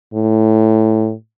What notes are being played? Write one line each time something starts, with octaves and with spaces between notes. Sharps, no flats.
A2